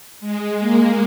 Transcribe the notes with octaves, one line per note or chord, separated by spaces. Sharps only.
G#3
A#3